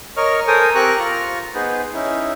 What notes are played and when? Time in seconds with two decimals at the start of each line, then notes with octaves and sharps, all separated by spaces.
0.17 A#4 C#5 D#5 C#6 F6
0.48 A4 A#4 C5 G#5 D#6
0.75 C4 G4 A#4 A#5 C#6 F#6
0.99 F4 A#5 C#6 F6
1.55 B3 D#4 G#4 B4 C5
1.94 C#4 D#4 E4